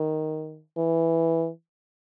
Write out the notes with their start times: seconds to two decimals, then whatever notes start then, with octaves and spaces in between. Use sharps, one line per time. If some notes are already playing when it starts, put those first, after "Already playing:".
Already playing: D#3
0.78 E3